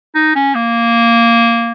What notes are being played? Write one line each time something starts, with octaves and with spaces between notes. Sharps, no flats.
D#4
C#4
A#3